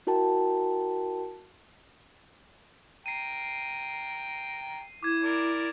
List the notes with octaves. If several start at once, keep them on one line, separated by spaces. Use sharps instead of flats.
E4 F#4 A#4 G5 A5
G5 A#5 C7 D#7
E4 D6 G#6
A#4 D5